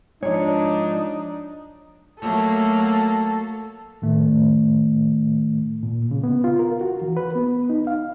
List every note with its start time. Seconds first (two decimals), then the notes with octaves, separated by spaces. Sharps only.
0.23 G#2 F3 D4 D#4 C#5
2.20 F#3 A3 A#3 A4
4.02 A2 D#3 A3
5.83 A#2
6.11 C#3
6.24 B3
6.44 F4
6.59 A#4
6.81 F#4
7.02 E3
7.17 B4
7.36 B3
7.70 D#4
7.87 F5